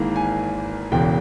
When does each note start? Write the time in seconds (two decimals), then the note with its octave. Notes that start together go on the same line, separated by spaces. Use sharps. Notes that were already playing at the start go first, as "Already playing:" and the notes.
Already playing: G#1 G#2 E3 A#3
0.16 G#5
0.92 E1 E2 C#3 G5